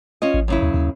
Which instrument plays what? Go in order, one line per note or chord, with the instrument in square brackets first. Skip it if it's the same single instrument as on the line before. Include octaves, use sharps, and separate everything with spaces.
[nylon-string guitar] C#4 F4 D#5
[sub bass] A1
[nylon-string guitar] F#2 C#3 E4
[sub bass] D#2
D#2